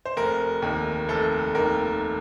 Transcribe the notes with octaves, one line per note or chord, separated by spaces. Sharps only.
C5
F1 A#4
D#2 D#3
F1 A4
D#2 D#3 A#4